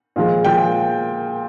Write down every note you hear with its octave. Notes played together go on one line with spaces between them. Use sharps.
A#2 F3 G#3
A#2 F3 G#3 G5